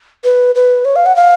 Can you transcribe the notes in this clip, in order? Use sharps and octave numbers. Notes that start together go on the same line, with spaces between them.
B4
B4
C#5
F5
F#5
F5